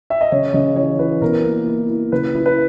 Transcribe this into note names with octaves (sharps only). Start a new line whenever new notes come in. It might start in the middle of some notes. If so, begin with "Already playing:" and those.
E5
D#5
C#3 C#5
C#3 D#5
E3 C#5
E3 B4
B2 A#4
A#3
E4
E4
C#3 B4
E4
B4